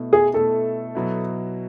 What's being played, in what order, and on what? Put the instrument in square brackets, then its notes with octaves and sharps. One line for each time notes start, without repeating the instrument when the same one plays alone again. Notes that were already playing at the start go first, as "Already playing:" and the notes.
Already playing: [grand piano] B2 A3 E4
[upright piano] G#4
[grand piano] B2 A3 E4 [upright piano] A4
[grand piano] B2 F#3 B3 E4